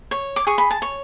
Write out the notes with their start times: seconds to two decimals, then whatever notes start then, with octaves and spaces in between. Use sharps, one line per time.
0.11 C#5
0.36 D6
0.47 G#4 C#6
0.58 B5
0.71 A5
0.82 C#5